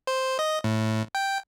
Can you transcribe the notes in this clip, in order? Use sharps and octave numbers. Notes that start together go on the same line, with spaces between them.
C5
D#5
A2
G5